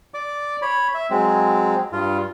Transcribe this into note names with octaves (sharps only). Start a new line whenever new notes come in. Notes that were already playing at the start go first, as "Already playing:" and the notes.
D5 D6
C#5 B5
E5
F#3 G#3 C4
G2 F4